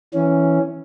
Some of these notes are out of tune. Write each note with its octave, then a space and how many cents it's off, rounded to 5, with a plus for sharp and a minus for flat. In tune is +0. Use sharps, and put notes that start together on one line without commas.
E3 +0 C#4 +0